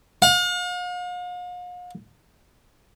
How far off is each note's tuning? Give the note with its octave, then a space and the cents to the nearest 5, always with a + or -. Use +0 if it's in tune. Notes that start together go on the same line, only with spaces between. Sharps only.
F5 +45